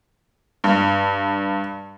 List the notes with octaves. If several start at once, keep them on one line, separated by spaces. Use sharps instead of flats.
G2